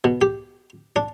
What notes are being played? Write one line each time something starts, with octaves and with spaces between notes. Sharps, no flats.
B2
G4
D4